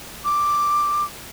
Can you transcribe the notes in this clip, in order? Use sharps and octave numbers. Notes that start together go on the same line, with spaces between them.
D6